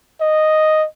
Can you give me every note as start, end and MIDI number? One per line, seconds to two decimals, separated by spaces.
0.21 0.86 75